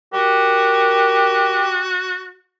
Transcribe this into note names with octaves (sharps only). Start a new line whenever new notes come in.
F#4 G4 A#4